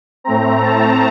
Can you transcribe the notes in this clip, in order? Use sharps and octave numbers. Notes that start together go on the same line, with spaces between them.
A2 A3 C4 A#5
A5